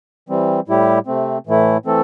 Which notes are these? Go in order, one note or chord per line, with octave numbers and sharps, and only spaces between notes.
E3 G3 C4
A2 G3 E4 G4
C3 A3 C4
A2 E3 A3 E4
E3 A3 C4 A4